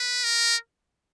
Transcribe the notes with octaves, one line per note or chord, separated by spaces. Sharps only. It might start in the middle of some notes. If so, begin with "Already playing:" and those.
Already playing: B4
A#4